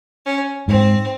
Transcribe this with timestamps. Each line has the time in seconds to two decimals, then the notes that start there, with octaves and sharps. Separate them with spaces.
0.26 C#4
0.68 G#2 C4